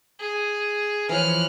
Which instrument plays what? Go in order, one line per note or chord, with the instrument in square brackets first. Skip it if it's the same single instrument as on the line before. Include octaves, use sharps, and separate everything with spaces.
[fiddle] G#4
[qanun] E3 F3 C#5 [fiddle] F6 F#6